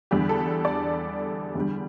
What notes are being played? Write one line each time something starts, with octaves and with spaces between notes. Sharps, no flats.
E2 D3 G3 G4
A4
D5
E2 D3 G3